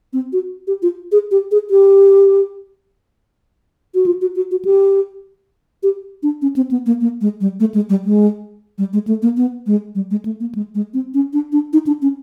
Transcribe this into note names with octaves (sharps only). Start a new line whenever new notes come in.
C4
F#4
G4
F4
G#4
G4
G#4
G4
F#4
F4
F#4
F#4
F#4
G4
G4
D4
C#4
C4
B3
A#3
A#3
G#3
G3
A3
G#3
G3
G#3
G3
G#3
A3
A#3
B3
G#3
G3
G#3
A3
A#3
G#3
G#3
C4
C#4
D4
D4
D#4
D4
C#4